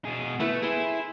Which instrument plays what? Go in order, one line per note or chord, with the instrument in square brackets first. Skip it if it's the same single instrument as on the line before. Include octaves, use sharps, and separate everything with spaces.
[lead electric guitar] B2 G#4
[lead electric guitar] A3 [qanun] E4 B4
[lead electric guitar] E4 [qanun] G#4 B5 C6